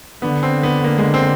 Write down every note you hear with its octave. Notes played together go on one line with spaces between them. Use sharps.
D3 B3
C4
B3
A#3
G#3
C4